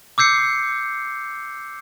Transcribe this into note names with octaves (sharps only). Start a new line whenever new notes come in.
D6 E6 G6 C7 C#7